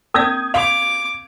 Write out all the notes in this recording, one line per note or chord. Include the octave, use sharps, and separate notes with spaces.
A#3 C4 A#4 D5 D#6 G6 G#6
F5 D6 F7